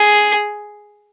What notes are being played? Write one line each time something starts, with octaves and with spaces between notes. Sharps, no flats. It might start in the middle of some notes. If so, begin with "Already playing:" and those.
Already playing: G#4